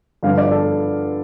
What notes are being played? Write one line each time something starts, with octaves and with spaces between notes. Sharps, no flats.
G2 D3 F3 F5
D5
A4